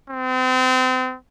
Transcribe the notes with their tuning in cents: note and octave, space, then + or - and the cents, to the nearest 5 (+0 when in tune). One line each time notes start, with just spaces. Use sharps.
C4 -35